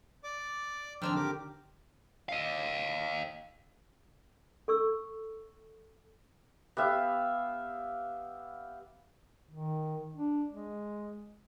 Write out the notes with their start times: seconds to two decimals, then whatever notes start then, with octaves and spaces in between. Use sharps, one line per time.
0.24 D5 D6
1.02 D#3 F3 C4 D4 G5 E6 F6
1.16 D3 G4 A#4 D6
2.29 D#5 F5
4.68 A4 C#6 E6
6.77 B3 G4 E5 F5
9.51 D#3
10.15 D4
10.50 G#3